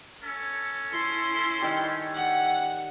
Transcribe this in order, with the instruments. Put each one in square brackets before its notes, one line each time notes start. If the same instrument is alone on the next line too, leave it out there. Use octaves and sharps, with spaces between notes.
[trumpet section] C#4 A4
[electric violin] E4 C6
[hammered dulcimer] D#3 G3
[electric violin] F#5